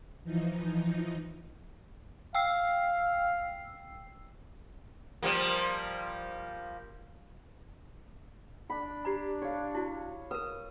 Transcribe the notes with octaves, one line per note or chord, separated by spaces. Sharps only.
E3 F3 D#4
F5 G5 E6 C7
F3 G3 A#3
D4 B5
G4 D5 A#5
C#5 F5
E4 F#4
A#4 B4 D#6